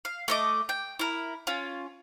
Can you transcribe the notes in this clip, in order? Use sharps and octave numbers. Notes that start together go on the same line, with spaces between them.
F5
A3 D#5 D6
G5
E4 A#4
C#4 F4